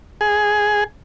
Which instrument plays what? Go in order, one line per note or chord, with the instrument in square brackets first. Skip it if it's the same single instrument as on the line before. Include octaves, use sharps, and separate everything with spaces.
[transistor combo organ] G#4